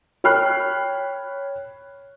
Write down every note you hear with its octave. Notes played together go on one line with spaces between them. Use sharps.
C#5 G5 B5 F6 F#6 C7